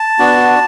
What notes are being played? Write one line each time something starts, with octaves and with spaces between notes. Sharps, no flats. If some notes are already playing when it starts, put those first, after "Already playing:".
Already playing: A5
B3 D4 F#4